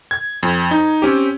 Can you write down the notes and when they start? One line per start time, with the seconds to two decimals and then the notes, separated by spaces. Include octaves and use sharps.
0.11 G#6
0.43 F2
0.71 D#4
1.02 C4 C#4 G4